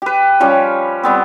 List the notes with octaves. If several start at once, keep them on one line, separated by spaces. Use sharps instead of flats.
G4 B4
F3 G3 C#4
G3 B3 C4